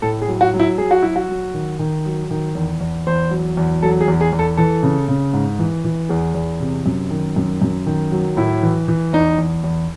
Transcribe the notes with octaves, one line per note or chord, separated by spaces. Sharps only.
A2 A4
G#4
F#3
F#4
F#3
E4
F#3 G#4
F#4
F#3 E4
F#4
F#3
D#3
D#3
F#3
D#3
E2
E2
E2 C5
F#3
E2
F#3 A4
G#4
E2
G#4
E2
A4
E3 A4
C#3
C#3
G#2
E3
E3
E2 G#4
E2
C3
F#2
D#3
F#2
F#2
D#3
F#3
A2 E4
E3
E3
E2 D#4
E2
E2